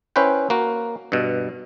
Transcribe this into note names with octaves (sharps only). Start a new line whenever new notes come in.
C#4 E4 B4 C5 G5
A#3 F#4
G2 B2